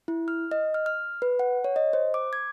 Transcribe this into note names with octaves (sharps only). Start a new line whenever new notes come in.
E4
F6
D#5
F6
F6
B4
F#5
C#5
D#5
C5
D6
G#6